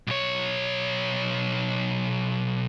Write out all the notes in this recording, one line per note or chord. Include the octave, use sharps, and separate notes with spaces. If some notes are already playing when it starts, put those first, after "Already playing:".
B1 C#5